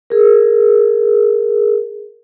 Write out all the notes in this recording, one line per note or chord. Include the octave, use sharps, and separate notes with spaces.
G#4 A#4